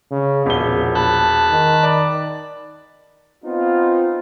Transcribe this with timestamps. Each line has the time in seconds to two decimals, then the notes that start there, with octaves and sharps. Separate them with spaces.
0.11 C#3
0.46 E1 A#1 B3 G7
0.95 A5 B5 F#6
1.50 D#3
1.83 D5
3.44 B3 C4 D#4 F4